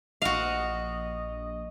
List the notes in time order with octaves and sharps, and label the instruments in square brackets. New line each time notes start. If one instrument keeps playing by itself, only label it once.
[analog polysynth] A#1 D#5 [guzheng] F#4 F5